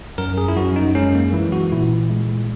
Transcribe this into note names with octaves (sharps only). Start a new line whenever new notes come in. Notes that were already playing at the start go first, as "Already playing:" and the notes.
F#2 A#4
G#4
E4
F#2 F#4
D#4
G#3 C#4
A#3
E3 E4
F#4
A#2 E4
G#3